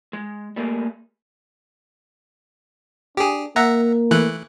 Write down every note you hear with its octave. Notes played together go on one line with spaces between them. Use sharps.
G#3
G3 A3 A#3 G#4
D4 G4 G#4
A#3 E5 F#5 A#5
E3 A3 F#6